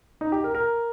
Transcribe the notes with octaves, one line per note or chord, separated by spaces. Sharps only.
D#4
G4
A#4
A#4